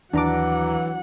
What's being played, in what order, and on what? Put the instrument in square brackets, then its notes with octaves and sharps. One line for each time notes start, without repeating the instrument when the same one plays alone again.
[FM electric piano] D#2 A#5 D6 [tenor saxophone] E3 [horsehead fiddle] F#3 F#5 [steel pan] D4